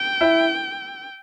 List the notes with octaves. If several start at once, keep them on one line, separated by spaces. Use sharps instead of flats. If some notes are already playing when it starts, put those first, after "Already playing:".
Already playing: G5
E4